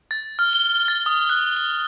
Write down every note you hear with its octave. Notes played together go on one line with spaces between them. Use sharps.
A6
F6
G7
A6
D#6
F#6
G7